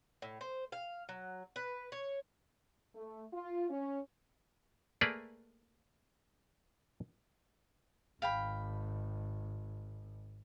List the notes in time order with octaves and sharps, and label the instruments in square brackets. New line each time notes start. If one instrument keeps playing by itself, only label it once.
[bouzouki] A2
C5
F5
F#3
B4
C#5
[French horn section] A3
F4
C#4
[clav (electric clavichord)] A3 A#3 G#4 A#4 B4 D5
[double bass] G#1 [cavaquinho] F5 G5 B5